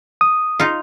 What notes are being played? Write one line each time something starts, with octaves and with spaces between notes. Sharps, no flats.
D#6
D#4 F4